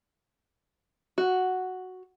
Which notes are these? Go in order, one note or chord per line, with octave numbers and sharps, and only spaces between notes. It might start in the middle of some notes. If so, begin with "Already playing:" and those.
F#4